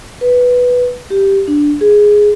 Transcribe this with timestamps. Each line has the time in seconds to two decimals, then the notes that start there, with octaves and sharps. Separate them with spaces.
0.21 B4
1.10 G4
1.48 D4
1.81 G#4